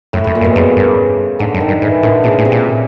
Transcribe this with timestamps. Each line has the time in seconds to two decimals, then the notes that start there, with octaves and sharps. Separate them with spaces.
0.13 F#2 A2
0.24 F#2 A2
0.35 A#2
0.41 G2
0.44 B2
0.56 F#2 C#3
0.76 G2
1.39 G#2 D3
1.54 F#2
1.60 D#3
1.68 G2
1.82 G#2 E3
2.03 A2 D3
2.23 A#2 C#3
2.38 A2
2.45 C3
2.52 A#2